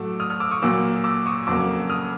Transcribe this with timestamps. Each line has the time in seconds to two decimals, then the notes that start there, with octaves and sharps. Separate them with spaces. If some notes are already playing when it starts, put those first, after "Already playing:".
Already playing: A2 F#3 A3 D6 E6
0.20 D#6 F6
0.30 D#6 F6
0.40 D6 E6
0.51 C#6 D#6
0.62 A#2 F#3 A#3 D6 E6
1.04 D6 E6
1.26 C#6 D#6
1.46 F2 C#3 F#3 A#3 D6 E6
1.90 D#6 F6